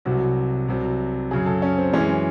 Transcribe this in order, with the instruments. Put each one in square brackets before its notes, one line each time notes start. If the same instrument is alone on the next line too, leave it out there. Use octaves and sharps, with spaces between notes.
[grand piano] C2 C3 F#3 F#4
C2 C3 F#3
F#2 C#3 F#3 G#4
A4
C#4
C4
F#2 E3 G#3 C#4